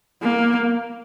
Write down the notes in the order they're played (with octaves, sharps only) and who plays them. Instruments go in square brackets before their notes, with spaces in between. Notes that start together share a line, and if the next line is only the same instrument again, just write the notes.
[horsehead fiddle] A#3